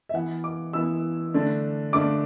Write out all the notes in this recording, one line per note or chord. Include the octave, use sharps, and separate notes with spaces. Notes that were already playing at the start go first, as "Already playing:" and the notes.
E5
E3 B3 E4 F#5
D6
E3 B3 E4 E6
D3 A3 D4
D3 A3 D4 D6